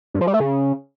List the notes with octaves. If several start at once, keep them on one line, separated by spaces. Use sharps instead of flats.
G2
F3
G3
A3
C#3